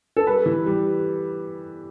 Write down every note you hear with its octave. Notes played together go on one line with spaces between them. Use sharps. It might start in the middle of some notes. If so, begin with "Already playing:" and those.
A4
G3 B4
E3
G3